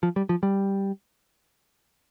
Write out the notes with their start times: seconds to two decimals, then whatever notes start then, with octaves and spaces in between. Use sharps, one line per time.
0.03 F3
0.16 G3
0.29 F3
0.43 G3